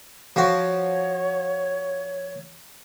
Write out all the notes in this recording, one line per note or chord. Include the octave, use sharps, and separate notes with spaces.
F3 F#4 C#5